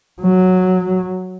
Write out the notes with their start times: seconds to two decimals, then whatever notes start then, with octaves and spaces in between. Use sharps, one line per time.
0.21 F#3